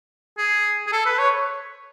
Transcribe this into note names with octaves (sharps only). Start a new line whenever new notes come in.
G#4
G#4
A4
B4
C#5